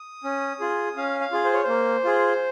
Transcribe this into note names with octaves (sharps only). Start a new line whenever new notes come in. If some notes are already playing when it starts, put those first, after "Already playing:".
Already playing: D#6
C#4
F4 G#4
C#4 F5
F5
F4 G#4
C5
C#5
A#3 C5
F4 G#4